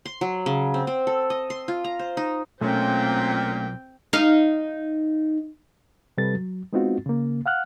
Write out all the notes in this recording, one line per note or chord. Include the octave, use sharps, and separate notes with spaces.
C6
F#3
C#3
C4
C4
A4
D#5
C6
F4
A#5
C5
D#4
B1 A#2 A3 C4 C#4 G5
D#4 F5
C3 G3 A4 B4 A6
F#3
G#3 B3 C4 D#4 F4 F#4
C#3 A#3
F5 F#5 F6 F#6